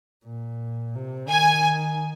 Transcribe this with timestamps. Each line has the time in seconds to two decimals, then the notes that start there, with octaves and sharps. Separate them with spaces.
0.25 A#2
0.94 C3
1.28 D#3 G#5